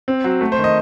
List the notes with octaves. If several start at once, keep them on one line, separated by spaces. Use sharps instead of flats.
C4
F#3
A3
C5
D#3
D#5